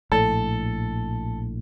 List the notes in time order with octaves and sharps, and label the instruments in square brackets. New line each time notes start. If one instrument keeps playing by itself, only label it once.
[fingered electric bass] A#1 A2 [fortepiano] A4